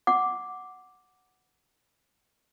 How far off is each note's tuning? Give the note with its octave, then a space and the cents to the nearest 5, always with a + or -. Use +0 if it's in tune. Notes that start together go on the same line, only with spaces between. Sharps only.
F#5 +0 D6 +0